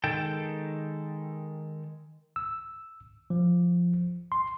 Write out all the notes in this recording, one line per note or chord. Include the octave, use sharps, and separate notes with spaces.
D#3 G#3 A4 G5
E6
F3
C6